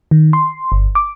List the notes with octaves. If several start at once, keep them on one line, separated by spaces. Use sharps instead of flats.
D#3
C6
G1
D6